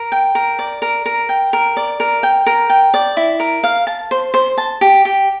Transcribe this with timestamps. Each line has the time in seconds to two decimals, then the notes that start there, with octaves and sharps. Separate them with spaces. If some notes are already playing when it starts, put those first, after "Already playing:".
Already playing: A#4
0.12 G5
0.35 A#4
0.59 D5
0.82 A#4
1.06 A#4
1.29 G5
1.53 A#4
1.77 D5
2.00 A#4
2.23 G5
2.46 A#4
2.70 G5
2.94 D5
3.17 E4
3.40 A#4
3.63 F5
3.87 A5
4.11 C5
4.34 C5
4.57 A5
4.81 G4
5.05 G4